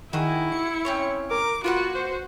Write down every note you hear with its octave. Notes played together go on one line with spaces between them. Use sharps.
D#3 E4 F#4 G#4
C#7
C4 C#4 C#5
A#4 D6
A#3 F4 F#4 B4 F#5
C5